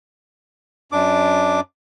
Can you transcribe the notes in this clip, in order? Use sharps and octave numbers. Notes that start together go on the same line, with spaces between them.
F#2 D4 D6